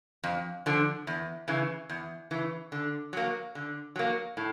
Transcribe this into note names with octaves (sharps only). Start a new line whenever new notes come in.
F2
D3 F3
E2
C#3 E3
E2
C#3 E3
D3
F#3 A#3
D3
F#3 A#3
A2